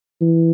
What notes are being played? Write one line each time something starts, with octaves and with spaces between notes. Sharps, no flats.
E3